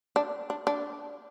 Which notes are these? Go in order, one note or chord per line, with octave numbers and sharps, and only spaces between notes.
D4
D4
D4